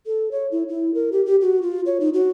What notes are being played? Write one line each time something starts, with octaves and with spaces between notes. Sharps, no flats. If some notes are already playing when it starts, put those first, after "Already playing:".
A4
C#5
E4
E4
A#4
G4
G4
F#4
F4
C#5
D#4
F#4